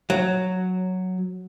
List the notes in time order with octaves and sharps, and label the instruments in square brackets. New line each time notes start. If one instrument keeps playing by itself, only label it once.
[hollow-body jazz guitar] F#3